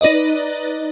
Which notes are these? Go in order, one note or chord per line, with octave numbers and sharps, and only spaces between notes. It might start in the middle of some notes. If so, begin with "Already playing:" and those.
D#4 B4 D5 D#5